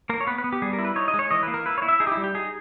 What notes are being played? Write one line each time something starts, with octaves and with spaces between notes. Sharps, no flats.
A#3 A#4
C#5
B3 B4
B4
B3
G4
G3 G#4
A#4
E4
B4
D#4 C#5
D#5
G#3
C#5
E3 D#5
A#3 B4
A#4
E4 B4
C#5
E4
E5
D#4 G#4
G4
E4
G3
G4
D#4 G#4